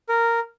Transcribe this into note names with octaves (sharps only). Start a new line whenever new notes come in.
A#4